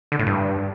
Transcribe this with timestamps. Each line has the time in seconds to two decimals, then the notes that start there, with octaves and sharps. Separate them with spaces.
0.12 D3
0.19 A2
0.26 G2